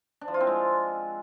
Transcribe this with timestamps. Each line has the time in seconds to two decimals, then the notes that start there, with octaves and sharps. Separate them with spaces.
0.21 D4
0.28 F3
0.34 F4
0.41 C4
0.47 G#3